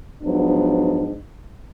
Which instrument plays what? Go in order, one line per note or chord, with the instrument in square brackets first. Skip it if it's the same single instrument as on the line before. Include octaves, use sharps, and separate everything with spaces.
[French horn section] G#2 F3 F#3 B3 D4